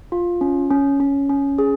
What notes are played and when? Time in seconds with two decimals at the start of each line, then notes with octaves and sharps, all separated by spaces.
0.12 F4
0.41 C#4
0.71 C#4
1.00 C#4
1.29 C#4
1.58 G#4